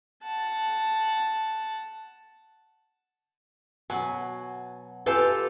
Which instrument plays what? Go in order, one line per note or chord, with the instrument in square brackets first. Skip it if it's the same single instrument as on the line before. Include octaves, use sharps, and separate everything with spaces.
[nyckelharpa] F#5 A5
[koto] B2 F#3 [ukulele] G#5
[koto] F4 G4 A4 [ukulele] B4 G#5